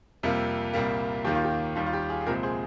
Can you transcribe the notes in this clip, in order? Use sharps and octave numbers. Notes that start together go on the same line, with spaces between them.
F2 C3 G3 A#3
C2 A#2 G3 A#3
D#2 D#3 A#3 G4
F4
G4
D#2 D#3 G3 F4
F4
G4
F4 G#4
G#4
C2 A#2 F3 G#3 C4 G4 A#4
G#4 C5